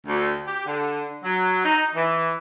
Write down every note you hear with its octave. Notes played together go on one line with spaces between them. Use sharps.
D2
G4
D3
F#3
D#4
E3